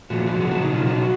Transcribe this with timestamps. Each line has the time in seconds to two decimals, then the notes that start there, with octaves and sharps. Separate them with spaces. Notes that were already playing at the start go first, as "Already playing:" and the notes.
0.10 A#2 F3 F#4
0.26 F#4
0.41 C#3 F#3 G#4
0.51 F#4
0.61 D#4
0.72 B2 F#3 F4
0.87 F#4